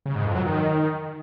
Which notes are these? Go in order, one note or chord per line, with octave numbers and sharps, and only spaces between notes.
C#3
G#2
F2
F#3
D#3